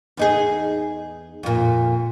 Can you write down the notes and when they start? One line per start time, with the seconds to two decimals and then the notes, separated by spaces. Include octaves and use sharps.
0.17 E2 D#4 G#4
1.43 F2 A#2